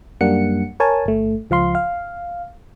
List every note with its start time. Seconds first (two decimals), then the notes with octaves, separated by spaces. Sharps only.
0.21 F#2 G3 A#3 D4 F#5 C#7
0.80 A#4 C#5 G#5 A5
1.06 G1 A3
1.50 C#2 F3 F5 C6
1.75 F5